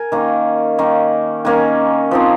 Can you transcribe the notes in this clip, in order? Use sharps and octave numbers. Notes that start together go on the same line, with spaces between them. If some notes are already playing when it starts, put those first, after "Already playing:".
Already playing: A#4 G#5
D#3 A#3 C#4
D#3 A#3 C#4
D#3 A#3 C#4 G#5
F3 C4 D#4